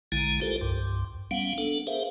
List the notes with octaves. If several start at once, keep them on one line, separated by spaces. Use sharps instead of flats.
A#1 D3 G#3 E4 G#5 A#5
F4 G4 A4 A#4 C5
C2 G2
G3 B3 C#4 F5 F#5
B3 D4 A4 F#5
G#4 A#4 C5 E5 F5